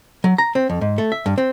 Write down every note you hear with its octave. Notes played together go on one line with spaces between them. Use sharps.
F#3
A#5
C4
F2
G#2
A3
E5
G2
C4